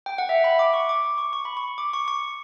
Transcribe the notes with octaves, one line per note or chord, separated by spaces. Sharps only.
G5
F#5
E5
B5
D6
C#6
D6
C#6
C#6
B5
C#6
D6
C#6
C#6